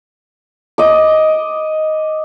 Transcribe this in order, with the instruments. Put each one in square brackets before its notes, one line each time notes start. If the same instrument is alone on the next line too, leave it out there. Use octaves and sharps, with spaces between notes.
[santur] D#5 D6